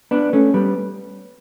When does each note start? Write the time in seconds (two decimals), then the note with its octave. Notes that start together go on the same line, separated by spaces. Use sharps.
0.11 B3 D4
0.33 A3 C#4
0.54 G3 B3